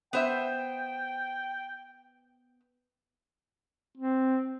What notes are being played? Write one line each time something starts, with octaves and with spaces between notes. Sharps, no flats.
B3 C5 E5 G5
C4